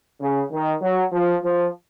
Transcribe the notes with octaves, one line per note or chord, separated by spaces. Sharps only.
C#3
D#3
F#3
F3
F3